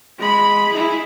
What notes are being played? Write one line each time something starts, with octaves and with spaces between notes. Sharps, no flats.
G#3 B5
E4 G#4